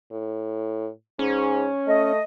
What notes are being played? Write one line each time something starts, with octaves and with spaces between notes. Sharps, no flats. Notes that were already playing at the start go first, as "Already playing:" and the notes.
A2
G#2 C#4
A3 D#5